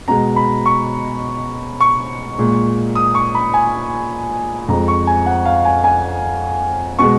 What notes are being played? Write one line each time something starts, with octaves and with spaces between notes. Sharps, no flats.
B2 G#3 A#5
B5
C#6
C#6
A#2 G#3
D#6
C#6
B5
G#5
F2 F3 G#3 A#5
C#6
G#5
F#5
F5
G#5
G#5
B2 G#3 C#6